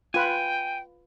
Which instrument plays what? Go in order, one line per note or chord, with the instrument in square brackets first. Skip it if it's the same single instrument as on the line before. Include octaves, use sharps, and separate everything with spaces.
[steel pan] F4 B4 [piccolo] G5 [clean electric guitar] G#5